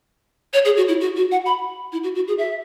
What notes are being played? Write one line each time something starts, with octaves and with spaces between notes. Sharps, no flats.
C#5
G#4
F#4
E4
F#4
F#4
F#5
B5
E4
F#4
F#4
G#4
E5